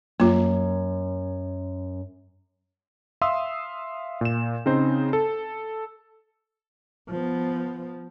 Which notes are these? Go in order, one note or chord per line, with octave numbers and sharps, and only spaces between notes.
F#2 A#3 F4
E5 F5 C6 D#6 E6
A#2 E7
C#3 C4 D#4 C5
A4
F3 B3